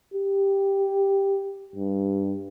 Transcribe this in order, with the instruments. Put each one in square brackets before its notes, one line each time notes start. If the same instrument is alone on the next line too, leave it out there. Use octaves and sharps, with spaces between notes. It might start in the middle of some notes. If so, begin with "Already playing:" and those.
[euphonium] G4
G2